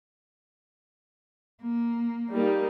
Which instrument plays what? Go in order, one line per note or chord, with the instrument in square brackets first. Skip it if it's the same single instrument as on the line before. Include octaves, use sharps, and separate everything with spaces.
[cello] A#3
[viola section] G3 A#3 D#4